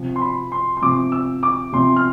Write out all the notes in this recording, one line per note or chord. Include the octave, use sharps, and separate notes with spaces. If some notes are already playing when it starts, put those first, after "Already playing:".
Already playing: C3 F3 C4
C6
B5
C6
C6
C3 F3 C4 D6
E6
D6
C3 F3 C4 C6
F6